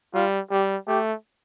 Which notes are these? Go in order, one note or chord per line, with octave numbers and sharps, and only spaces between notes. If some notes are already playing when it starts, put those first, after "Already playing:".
G3 F4
G3 G4
A3 G4